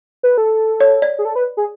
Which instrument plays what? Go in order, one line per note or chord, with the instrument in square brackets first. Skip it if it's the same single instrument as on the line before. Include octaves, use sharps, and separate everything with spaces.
[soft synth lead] B4
A4
[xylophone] C#5
D5
[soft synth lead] G#4
A4
B4
G#4